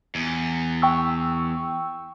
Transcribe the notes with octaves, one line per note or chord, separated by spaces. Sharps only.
E2
G5 C#6 E6